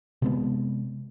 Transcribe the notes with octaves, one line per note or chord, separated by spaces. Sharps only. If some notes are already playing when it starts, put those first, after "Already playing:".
C3 G#3 B3